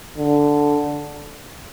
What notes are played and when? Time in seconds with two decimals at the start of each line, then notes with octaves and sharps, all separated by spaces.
0.18 D3